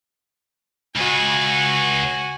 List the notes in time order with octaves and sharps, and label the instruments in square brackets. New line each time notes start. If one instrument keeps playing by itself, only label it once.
[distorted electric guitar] C#2 [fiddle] F#4 G#5